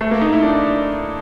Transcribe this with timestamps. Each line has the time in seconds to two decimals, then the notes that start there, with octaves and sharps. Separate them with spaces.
0.01 A3
0.11 A#3
0.21 D#4
0.33 E4
0.43 D4